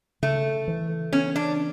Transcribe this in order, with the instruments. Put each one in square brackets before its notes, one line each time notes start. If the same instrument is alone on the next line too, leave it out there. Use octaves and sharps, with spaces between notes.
[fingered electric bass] C#3 [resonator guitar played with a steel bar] A3
[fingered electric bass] E3
[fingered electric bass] B3 [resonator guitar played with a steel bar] C#4
[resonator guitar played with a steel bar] D4